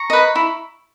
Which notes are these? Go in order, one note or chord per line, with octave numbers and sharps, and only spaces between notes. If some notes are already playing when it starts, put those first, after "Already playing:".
Already playing: A#5 C#6
B4 D#5
E4